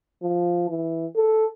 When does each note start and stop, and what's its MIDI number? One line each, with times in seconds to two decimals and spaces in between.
0.23 0.68 53
0.69 1.07 52
1.16 1.47 69